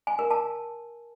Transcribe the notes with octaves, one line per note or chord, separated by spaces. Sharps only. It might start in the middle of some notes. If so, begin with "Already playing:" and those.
G#5
A#4
A5